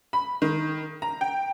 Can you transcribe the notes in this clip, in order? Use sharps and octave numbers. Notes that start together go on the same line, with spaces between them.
B5
D#3
A#5
G5